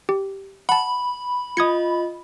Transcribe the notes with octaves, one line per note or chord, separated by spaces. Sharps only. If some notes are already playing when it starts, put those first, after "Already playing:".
G4
F#5 A5 B5
F4 D#5 D#6 G#6 C#7